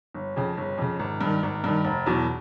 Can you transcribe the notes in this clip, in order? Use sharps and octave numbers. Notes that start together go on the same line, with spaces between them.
G1
F2 C#3
G1
F2 C#3
G#1
G2 D#3
G#1
G2 D#3
F1
E2 B2 F#3